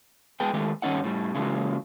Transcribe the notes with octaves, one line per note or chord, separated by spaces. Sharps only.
G#3 B3 G#4 B4 G5
D#3 G#3 A3 G4
G2 D#3 C4 C#4 D#4 F#5
A2 G3
C#3 E3 F#3 G#3 A#3